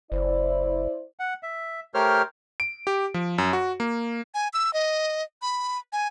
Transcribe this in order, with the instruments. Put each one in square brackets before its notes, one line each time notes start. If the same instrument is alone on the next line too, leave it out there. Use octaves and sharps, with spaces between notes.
[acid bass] F#1 [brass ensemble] E4 C5 D5
[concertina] F#5
E5
A3 G4 A#4 C5 C#5 F6
[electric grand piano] D7
G4
F3
F#2
F#4
A#3
[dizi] G#5
E6
D#5
B5
G#5